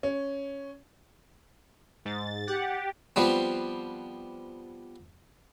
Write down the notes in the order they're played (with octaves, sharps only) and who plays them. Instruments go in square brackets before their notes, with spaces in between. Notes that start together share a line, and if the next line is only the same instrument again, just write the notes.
[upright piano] C#4
[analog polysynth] G#2 [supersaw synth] A6
[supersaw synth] G4 [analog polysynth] F#5
[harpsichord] F3 G3 B3 C4